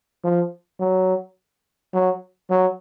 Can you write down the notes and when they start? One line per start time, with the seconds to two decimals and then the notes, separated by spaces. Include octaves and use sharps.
0.24 F3
0.80 F#3
1.94 F#3
2.50 F#3